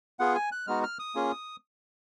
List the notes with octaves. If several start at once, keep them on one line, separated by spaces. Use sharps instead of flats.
B3 F4 G#4 F#5
G#5
F#6
G#3 B3 D#4 F#4 F6
F6
D#6
A#3 C#4 F4 G#4